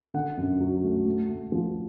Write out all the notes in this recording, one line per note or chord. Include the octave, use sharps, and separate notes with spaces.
D3 F#5
F#2
F#3
A3
A3
A3
F3